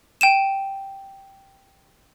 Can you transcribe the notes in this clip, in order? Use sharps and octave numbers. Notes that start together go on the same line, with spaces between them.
G5 D#7 E7